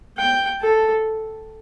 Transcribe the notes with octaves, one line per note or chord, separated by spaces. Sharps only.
G5
A4